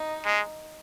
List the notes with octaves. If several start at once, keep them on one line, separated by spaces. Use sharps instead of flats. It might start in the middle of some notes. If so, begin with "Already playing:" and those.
Already playing: D#4
G#3